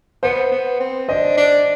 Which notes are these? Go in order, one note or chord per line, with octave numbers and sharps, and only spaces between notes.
B3 C5
B3
C4
D4 C5 D#5
D4